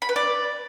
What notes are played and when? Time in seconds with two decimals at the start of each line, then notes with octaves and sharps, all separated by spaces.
0.02 B5
0.09 B4
0.16 D5